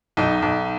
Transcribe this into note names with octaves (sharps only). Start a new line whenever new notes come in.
B1 D#4
B1